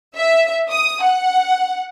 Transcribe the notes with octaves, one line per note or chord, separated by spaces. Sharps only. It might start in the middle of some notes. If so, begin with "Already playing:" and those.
E5
D#6
F#5